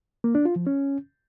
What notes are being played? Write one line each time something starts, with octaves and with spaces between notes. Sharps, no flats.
A#3
D4
F4
F3
C#4